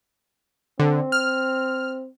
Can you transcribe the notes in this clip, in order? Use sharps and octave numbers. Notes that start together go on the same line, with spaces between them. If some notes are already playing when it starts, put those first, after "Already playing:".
D3 C4
F6